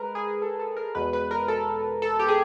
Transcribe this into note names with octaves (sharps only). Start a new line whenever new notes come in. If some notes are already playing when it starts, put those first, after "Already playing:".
Already playing: G#3 A#4 B4
G#4
A4
A4
A#4
E2 B2 G#3 B4
B4
A#4
A4
A4
G4
G#4